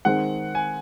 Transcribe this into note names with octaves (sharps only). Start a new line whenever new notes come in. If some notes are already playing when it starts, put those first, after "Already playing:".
D#3 G#3 C4 F#5
G#5